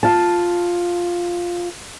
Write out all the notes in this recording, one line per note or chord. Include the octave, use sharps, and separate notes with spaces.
F4 A5